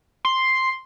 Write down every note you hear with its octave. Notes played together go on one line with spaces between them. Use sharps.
C6